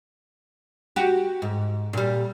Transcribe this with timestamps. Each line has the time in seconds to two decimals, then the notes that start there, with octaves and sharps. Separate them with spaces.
0.96 F#4 G4
1.42 G#2
1.93 A#2 G3